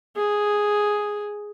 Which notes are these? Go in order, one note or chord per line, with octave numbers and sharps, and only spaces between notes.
G#4